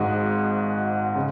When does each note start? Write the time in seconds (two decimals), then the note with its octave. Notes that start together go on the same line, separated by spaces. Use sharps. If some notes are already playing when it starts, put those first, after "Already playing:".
Already playing: G#1 G#2 G#3 D#4 F#4
1.15 C#3